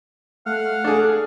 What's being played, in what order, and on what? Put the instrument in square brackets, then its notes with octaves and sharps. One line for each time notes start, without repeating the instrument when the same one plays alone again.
[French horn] A3 [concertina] F5 F#5 F6
[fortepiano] D4 G#4 [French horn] A4